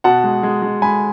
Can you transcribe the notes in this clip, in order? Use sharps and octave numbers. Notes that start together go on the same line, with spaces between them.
B2 F#5 A5
G#3
G#3
G#3
G#3 G#5 B5